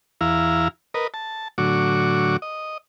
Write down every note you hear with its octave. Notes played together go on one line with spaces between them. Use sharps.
E2 E4 F5 A#5
A#4 B4 D#5
A5
A2 D3 F#3 F#4 C#6 D6
D#5